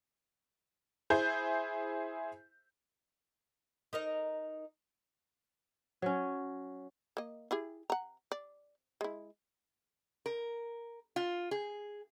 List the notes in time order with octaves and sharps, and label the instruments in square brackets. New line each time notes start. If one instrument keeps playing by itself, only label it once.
[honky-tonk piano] E4 G#4 C5 G6
[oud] D#4 A#4 D#5
[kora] F#3 C#4
[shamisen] A#3 D#5
E4 G4 G#4
F#5 A#5
D5
G#3 E4
[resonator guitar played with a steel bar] A#4
F4
G#4